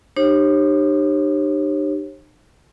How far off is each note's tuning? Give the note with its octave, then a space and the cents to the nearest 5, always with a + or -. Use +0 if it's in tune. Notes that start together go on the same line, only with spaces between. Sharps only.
D#4 -45 G4 +0 C#5 -40